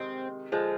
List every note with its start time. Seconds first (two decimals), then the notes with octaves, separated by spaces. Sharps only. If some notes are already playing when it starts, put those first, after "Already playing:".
Already playing: C3 D#3 G#3 C4
0.52 D3 F3 G#3